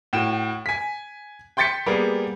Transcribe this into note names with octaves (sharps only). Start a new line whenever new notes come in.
A2 F#4 G5 E7
G#5 B6
G5 C6 G6 A6 B6 C#7
G3 A#3 B3 G#4